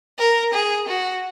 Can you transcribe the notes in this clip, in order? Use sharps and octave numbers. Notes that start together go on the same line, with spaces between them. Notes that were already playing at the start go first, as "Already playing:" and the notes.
A#4
G#4
F#4